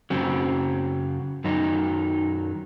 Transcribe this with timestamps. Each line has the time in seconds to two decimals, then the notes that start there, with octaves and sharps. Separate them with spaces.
0.10 F#2 C#3 F#3 C4
1.44 F#2 D#3 F#3 D#4